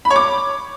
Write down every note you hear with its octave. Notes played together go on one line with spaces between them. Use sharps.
B5
C#5
D6